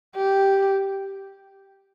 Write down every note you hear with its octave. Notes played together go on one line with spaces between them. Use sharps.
G4